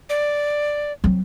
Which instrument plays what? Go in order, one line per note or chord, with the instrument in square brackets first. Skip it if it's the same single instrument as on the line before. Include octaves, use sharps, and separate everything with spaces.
[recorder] D5
[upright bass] F#3 C4